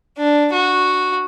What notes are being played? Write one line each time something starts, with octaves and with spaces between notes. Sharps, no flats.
D4
F#4